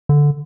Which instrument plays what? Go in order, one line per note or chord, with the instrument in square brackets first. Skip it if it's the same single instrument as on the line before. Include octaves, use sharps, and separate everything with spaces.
[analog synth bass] D3